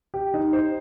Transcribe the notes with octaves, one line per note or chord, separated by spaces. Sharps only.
G4
D#4
C5